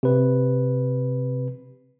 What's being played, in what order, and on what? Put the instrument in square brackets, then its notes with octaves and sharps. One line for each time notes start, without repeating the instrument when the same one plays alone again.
[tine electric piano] C3 B4